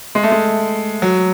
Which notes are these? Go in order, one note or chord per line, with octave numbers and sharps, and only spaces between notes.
G#3
A3
G#3
F#3